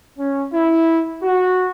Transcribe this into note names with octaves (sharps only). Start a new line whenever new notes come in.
C#4
E4
F#4